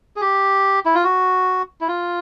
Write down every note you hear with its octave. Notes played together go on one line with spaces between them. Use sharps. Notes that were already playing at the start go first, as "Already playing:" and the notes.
G#4
G4
E4
F4
F#4
E4
F4